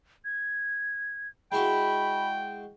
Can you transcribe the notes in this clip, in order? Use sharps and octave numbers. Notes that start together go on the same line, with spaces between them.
G#6
G#3 E4 F#4 G5 B5